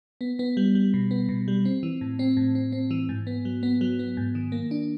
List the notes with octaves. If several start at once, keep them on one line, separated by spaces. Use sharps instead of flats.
B3
B3
G3
G3
B2
B3
B2
G3
C4
E3
A2
C4
A2
C4
C4
E3
G#2
B3
F#3
B3
F#3
B3
G#2
D#3
A#3
D4